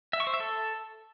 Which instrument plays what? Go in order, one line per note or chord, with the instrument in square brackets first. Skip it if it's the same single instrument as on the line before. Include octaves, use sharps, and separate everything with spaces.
[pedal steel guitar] E5
C#6
C5
E5
A4